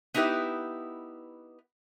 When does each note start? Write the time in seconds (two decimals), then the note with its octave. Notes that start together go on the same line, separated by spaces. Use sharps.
0.14 B3 D#4 E4 G4 B4 E5